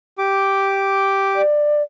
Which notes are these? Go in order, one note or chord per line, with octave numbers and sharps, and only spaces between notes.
G4 D6
D5